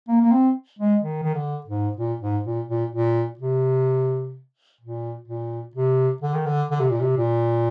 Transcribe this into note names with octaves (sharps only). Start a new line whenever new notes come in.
A#3
A#3
C4
G#3
D#3
D#3
D3
G#2
A#2
G#2
A#2
A#2
A#2
C3
A#2
A#2
C3
D3
D#3
D3
D3
C3
A#2
C3
A#2